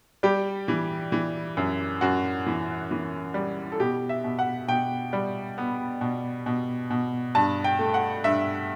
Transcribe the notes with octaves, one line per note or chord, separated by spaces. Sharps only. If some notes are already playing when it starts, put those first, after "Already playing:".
G3 G4
E3
E3
F#2
F#2 F#4
E3
E3
G3
A4
B2 G4
E5
B2
F#5
B2 G5
G3
B3
B2
B2
B2
G2 A5
G5
A3
F#5
G2 E5